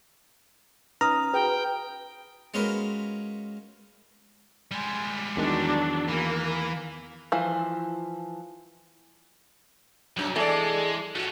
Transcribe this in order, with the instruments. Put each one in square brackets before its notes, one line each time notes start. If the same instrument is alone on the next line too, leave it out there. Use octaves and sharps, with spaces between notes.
[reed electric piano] C#4 D#4 B4 [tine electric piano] A#5 [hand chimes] D#6 F6
[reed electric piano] F#4 G#4 [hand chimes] B4 [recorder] G5
[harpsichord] G#3 C#4 F4 F#4 A#4 B4
[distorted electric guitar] G3 G#3
[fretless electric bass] E2 D#3 [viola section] F#3 D4
[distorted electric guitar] E3 [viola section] A#3
[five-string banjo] E3 F3
[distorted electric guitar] B1 [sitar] F#2 F#3
[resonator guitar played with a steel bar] E3 A4 [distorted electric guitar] G#3 [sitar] G#4 D5
[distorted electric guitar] A3 C#4 [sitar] F4 F#4